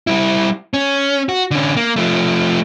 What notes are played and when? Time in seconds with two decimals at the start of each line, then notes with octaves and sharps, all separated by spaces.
0.07 G3 E4
0.74 C#4
1.29 F#4
1.51 D3 C#4
1.77 A#3
1.96 F3 A3